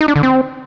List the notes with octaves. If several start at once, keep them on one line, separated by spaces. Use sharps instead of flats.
D#4
D4
D3
C4